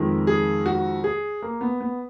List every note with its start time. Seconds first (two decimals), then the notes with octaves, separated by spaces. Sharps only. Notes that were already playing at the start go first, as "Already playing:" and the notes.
Already playing: F2 D#3 G#3
0.27 G#4
0.66 F#4
1.04 G#4
1.42 A#3
1.61 B3
1.81 B3